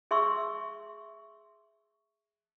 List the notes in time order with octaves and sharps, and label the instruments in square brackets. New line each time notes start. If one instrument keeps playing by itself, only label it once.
[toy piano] G#4 E5 C6 C#6 E6